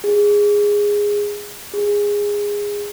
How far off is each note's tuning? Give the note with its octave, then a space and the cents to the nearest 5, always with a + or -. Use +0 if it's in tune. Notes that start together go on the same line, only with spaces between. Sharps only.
G#4 -10
G#4 -15